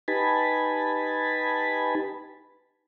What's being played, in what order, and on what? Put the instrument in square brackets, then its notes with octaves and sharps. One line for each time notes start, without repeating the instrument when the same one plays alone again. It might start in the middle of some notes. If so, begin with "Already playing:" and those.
[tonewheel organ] D#4 G4 B4 G#5 A5 B5